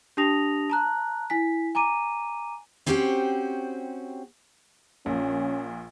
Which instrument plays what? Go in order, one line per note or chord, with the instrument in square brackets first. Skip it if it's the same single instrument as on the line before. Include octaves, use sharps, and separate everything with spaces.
[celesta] D4 G4 A5 D#6 A#6 F7
A5 A#5 F#6
E4 G#5 B6
G#5 A#5 D6 D#7
[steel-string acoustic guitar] C4 C#4 F#4 G4 C5 G5
[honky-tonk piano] A#1 A#2 [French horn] C#4